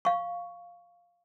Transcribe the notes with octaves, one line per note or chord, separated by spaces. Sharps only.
F5 C#6